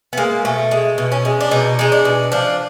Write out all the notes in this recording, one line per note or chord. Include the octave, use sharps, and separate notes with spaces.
B3
G#3 A#3
B2 A3
G#3
B2
C#4
G#3
D4
B2 D#4
G#3 D#4
D4
B2
F3 D4